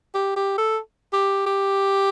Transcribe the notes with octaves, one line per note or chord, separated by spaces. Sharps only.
G4
G4
A4
G4
G4